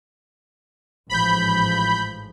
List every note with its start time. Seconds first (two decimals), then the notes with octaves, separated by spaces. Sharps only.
1.10 A1 G#2 F3 B5 G6